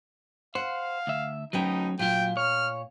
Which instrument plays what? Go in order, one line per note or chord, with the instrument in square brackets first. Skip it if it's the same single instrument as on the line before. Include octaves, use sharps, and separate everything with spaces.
[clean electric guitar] C5 [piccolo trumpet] F5 [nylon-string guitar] F#5
[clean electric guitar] D2 E5
[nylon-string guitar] D2 B3 G5 [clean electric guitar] F#3 C#4 [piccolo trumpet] D#4
[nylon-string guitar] A#2 [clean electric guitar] F#3 F4 [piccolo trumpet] G5
[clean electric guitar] C#5 [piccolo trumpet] F6